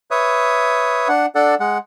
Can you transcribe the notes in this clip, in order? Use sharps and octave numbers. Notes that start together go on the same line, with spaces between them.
B4 C#5 E5 D#6
D4 F#5
D4 A4 D5 F#5
G#3 F#5